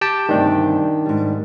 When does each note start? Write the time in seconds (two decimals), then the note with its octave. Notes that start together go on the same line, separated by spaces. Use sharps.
0.01 G4 G5 A5
0.29 D2 G2 C3 D#3 D4
1.06 G#2 G3